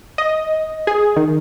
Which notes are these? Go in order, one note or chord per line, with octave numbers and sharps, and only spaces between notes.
D#5
G#4
D#3